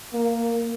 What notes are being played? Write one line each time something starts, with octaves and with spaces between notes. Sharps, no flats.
A#3